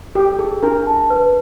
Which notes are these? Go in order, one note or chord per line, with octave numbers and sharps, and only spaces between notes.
G4 A4
G#4 A4
D4 A#4
A5
B4